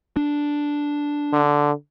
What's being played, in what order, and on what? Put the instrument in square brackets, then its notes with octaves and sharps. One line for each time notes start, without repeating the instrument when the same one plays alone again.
[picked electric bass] D4
[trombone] D3